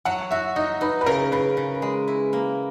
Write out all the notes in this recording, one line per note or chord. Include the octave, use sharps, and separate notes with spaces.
F#3 F#5
F#4 E5
D#4 D#5
D#4 B4
B4
C#3 A#4
C#3 B4
C#3
G#3
E4
A#3